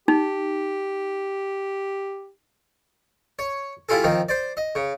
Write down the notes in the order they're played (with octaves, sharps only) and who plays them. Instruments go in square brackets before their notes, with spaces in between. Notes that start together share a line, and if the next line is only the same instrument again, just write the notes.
[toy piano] D#4 [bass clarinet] G4
[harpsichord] C#5
G3 E4 F4 G#4 A4
D#3 F3 C4
C5 D5
D#5
C#3